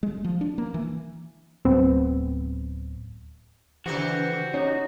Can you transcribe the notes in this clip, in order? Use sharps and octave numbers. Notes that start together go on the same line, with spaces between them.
G#3
F3
D4
A#3
E3
D1 B3 C4
C#3 E3 F#4 G4 C5
C#4 D#4